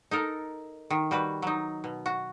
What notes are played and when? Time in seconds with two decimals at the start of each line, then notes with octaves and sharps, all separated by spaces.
0.11 D#4 A4 A#4
0.90 D#3
1.11 G3 F#4 B4
1.42 F#3 D#4
1.84 B2
2.06 F#4